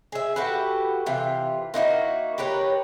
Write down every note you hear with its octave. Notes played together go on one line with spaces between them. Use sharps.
G#4 E5
F#4 G4 A4 B4
C3 E3 F4
A#3 D#4 E4 F#4
G4 A#4 B4 C#5